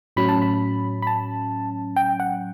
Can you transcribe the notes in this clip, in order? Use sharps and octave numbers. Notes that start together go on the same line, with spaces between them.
A2 F#3 C#4 B5
A5
B5
B5
A5
G5
F#5